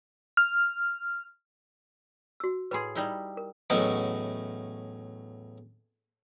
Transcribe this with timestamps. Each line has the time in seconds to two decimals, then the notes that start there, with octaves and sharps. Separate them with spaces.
0.37 F6
2.40 F#4 E6
2.71 A2 G#4 B4 B5 C6
2.95 G3 D#4 E4
3.37 A#4
3.70 E2 A2 F#3 C#4 D#4